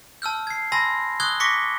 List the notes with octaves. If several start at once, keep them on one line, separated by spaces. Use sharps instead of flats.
A5 E6 F6 G6
G#6 C7
G#5 A5 B5 C6 E6 A#6
C#6 D#6 E6 F#6 G#6 G7
C#6 D6 A#6 B6 C#7